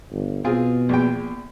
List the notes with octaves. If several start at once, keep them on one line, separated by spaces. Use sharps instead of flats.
G1
B2 C4 F4 G#4
A#1 E2 G5